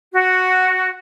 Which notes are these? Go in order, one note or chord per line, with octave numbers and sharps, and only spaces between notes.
F#4